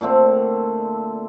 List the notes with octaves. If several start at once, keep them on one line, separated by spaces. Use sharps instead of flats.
A#2 D3 A3 C4